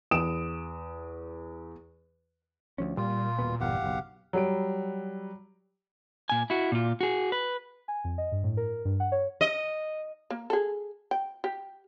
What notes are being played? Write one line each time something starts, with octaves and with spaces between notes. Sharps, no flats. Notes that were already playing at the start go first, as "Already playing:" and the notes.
E2 D#6 D7 E7
D2 F3 C#4
A#2 G3 F4
D#1 B2 B3
G1 E2 G4 F5 F#5
F#1 B1
F#3 G3 D7
A#2 G#5
E4 F#4
A#2 F4
F#4 G#4
B4
G#5
F2
D#5
G2
A2
A#4
G2
F#5
C#5
D#5
A#3
G#4 A4
G5
G4